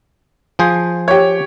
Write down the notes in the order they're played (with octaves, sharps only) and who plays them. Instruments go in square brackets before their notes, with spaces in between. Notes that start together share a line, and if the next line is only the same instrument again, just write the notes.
[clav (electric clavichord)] F3 G#4 C5
[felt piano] G4 C#5